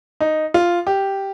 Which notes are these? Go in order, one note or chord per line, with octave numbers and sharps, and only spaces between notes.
D#4
F4
G4